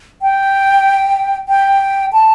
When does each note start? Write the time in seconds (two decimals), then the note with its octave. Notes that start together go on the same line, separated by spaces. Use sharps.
0.22 G5
1.48 G5
2.13 A5